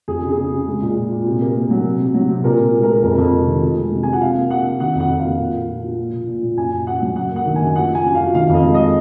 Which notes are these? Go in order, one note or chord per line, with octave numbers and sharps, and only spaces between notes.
F2 G#4
C#3
G#4
C#3
C#3
G#3
A#2
A#2
A#2
C3
A#3
A#3
F#3
C3
C3
F#3
C3
A#2 A#4
A#2
G#3
A#4
G#3
F2 A#4
F2
C3
D#3
F3
G#3
C3
F3 G#5
F#5
C3 F5
A#3
C3 F#5
F3
D#3 F#5
F2
F#5
F2
F5
A#3
A#2
A#2
F3
F3
A#2
A#2
A#2
A#2
F#2 G#5
F#2
C#3 F#5
F#3
F#2 F#5
A#3
F#5
D#3
G#5
F#2
F3 F#5
F3 G#5
F#2
F5
F3
D#3 F5
F2 D#5
G#3
D#5